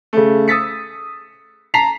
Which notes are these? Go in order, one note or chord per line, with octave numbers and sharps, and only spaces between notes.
C#3 A3
D#6 E6 A6 B6 C#7
A5 A#5 B6 C7 F7